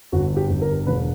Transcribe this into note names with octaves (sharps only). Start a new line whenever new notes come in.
G1 F#4
G4
G1
A#4
E1 B4